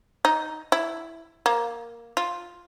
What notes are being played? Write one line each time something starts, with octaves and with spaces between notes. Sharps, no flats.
D#4
E4
A#3
F4